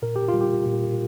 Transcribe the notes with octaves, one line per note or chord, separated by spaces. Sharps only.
A#2 A#4
G4
F4
G3
G4
A#2